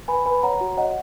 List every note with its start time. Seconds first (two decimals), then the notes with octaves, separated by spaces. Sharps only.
0.08 B4 G#5 B5
0.26 B4 G#5 B5
0.43 C#5 F#5 A#5
0.61 F#4
0.77 C#5 D#5 F#5